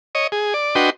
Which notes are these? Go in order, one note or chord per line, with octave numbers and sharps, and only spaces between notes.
C#5 D#5
G#4
D5
D4 F#4 B4 D#5 G5 C6